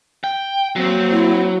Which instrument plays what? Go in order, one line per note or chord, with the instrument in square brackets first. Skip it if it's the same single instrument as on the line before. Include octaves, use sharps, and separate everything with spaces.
[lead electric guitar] G5
[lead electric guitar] F#3 [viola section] A#3 C4
[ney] E4